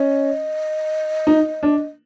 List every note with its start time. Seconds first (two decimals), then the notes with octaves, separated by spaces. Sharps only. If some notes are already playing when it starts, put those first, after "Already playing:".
Already playing: C#4 D#5
1.27 D#4
1.63 D4